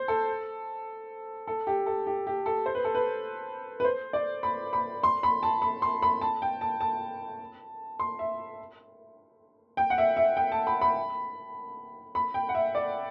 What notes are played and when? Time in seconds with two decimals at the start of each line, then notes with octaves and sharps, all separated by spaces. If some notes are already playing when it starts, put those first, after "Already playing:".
Already playing: C5
0.08 A4
1.47 A4
1.67 G4
1.86 A4
2.07 G4
2.27 G4
2.46 A4
2.66 C5
2.75 B4
2.85 A4
2.95 B4
3.80 B4
3.84 C5
4.13 D5
4.43 B5
4.73 B5
5.03 C6
5.23 B5
5.43 A5
5.62 B5
5.82 C6
6.02 B5
6.22 A5
6.42 G5
6.61 A5
6.81 A5
7.99 C6
8.19 E5
9.77 G5
9.90 F#5
9.98 E5
10.17 E5
10.37 G5
10.52 A5
10.67 B5
10.81 B5
12.15 B5
12.34 G5
12.49 F#5
12.55 E5
12.75 D5